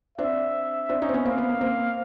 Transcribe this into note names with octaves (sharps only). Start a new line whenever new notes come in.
C4 D4 E5
C4 D4
C#4 D#4
C4
B3 C#4
A#3 C4 F5
B3
A#3
A#3 C4